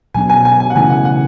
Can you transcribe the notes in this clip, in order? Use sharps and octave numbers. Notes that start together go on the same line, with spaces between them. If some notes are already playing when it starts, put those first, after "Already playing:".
B2 F#3 B3 D4 G#5
G#5
G#5
G#5
F#5
C#3 E3 A3 C#4 E4 G#5
F#5
F#5